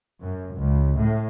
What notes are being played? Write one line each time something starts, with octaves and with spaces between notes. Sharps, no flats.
F#2
C#2
A2